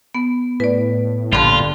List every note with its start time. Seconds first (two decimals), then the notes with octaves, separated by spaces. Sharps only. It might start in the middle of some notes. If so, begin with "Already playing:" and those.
0.14 B3
0.60 A2 B4 D5
1.33 A#1 G2 D3 F4